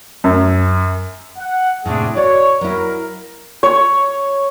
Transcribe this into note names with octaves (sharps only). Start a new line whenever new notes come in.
F#2
F#5
A2 C3 A3 D4 G#4
F#4 A#4 C#5 D5
F#3 E4 A#4
C#5